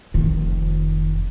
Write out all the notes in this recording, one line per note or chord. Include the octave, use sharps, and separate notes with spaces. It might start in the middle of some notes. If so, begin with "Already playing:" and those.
F1 D#3